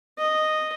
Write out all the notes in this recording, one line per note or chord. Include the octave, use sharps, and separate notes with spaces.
D#5